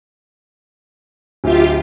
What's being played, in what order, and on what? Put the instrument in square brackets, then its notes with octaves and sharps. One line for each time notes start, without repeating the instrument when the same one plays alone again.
[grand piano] D1 E5 [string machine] F4 G4